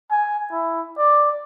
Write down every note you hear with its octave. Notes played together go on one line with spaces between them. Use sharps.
G#5
E4
D5